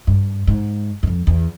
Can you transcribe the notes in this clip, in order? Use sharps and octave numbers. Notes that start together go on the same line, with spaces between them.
G2
G#2
F#2
F2
E2